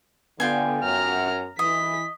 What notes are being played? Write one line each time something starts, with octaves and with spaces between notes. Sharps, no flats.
D3 B3 F4 G5 G#5
F#2 A#5 F6
E3 D#5 B6